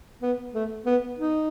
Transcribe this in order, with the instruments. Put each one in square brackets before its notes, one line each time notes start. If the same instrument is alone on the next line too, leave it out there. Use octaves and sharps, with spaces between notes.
[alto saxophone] B3
A3
B3
D#4